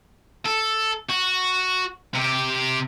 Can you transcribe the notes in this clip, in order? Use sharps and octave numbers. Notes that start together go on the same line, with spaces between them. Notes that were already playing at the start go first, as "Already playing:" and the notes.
A4
F#4
C3 G4